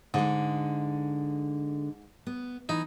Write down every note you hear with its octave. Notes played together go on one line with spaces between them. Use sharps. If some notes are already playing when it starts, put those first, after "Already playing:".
G#2 D3 G#3
B3
E3 D#4